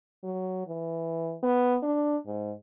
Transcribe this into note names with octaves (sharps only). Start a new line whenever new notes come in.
F#3
E3
B3
D4
G#2